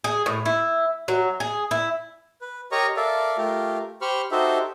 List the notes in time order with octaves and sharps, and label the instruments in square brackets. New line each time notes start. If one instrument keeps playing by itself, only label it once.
[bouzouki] G#4
A2
E4
F#3
G#4
E4
[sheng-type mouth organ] B4
G4 A#4 C#5 D#5 A#5 C#6
A4 A#4 D5 E5 F5
A3 F4 G4 A#4
G4 C5 B5 C#6 F6
D#4 F#4 G4 A4 C5 E5